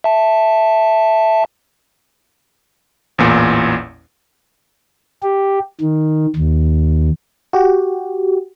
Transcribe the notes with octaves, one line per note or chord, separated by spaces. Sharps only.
E5 A5
A1 E2 A#2
G4
D#3
D#2
F#4 G4